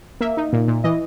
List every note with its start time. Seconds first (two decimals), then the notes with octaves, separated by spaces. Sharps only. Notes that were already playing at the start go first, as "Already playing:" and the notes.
0.20 A#3 E5
0.37 D#4
0.53 A#2
0.68 A#2
0.84 E3 D#5